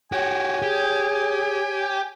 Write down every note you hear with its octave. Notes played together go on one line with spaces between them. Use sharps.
F#4 G4 C#5 G#5
G4 G#4